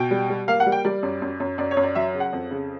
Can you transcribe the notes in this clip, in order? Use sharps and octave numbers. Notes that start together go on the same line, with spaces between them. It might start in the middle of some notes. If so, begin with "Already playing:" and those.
Already playing: B2 G5
G3
G3
A#3 F5
F#5
G3
G5
G3 D5
F#2
F#2
F#2
F#2 D5
C#5
F#2
D5
F#3 E5
C#3
F#5
F2
C#3